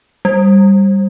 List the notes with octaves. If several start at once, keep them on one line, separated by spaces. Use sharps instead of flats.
G3